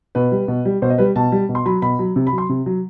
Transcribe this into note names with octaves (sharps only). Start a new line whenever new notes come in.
B2 B4
G3
B2
G3
B2 C5
D#5
G3 B4
B2 A5
G3
B2
C6
F#3 B5
B2 B5
F#3
C3
B5
F#3
C6
C3
F#3